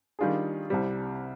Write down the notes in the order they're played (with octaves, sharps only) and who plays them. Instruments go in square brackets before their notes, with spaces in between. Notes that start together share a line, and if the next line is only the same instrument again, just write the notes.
[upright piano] D#3 G3 D4 F4 G#4
C2 C3 G3